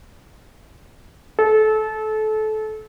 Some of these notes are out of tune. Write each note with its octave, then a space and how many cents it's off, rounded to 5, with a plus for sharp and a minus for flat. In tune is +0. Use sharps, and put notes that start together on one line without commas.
A4 -25